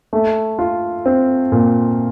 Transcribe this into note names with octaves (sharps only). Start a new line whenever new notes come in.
A3
F4
C4
A#2